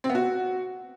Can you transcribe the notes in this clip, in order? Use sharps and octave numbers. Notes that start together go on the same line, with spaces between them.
C4
B3
F#4